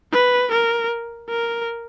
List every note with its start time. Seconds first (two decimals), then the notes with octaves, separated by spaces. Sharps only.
0.12 B4
0.52 A#4
1.29 A#4